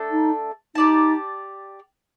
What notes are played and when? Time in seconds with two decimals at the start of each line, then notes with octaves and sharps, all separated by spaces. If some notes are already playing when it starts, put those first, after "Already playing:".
Already playing: A3 D4 A4
0.11 D#4
0.75 D#4 G4 D5 A5